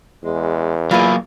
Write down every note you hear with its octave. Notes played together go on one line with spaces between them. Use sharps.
E2 G#3
F#3 A#3 E4 F4 G#5